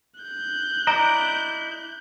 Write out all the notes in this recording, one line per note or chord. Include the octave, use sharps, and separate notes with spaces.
F#6 G6
E4 D5 D#5 A#5